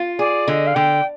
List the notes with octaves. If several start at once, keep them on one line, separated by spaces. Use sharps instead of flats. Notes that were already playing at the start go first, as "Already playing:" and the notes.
Already playing: F4
G#4 D5
D3 D#5
F5
D3 G5